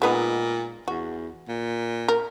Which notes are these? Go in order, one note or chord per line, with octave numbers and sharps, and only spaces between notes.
A#2 G#3 B3 D#4
E2 F#4
A#2
A#4